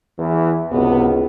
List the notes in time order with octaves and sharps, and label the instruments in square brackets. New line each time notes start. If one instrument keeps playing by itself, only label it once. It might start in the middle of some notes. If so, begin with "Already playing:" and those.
[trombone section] E2 E3
[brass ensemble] F#1 C3 B3 [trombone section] C#2